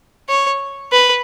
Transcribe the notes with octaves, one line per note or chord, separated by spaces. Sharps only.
C#5
B4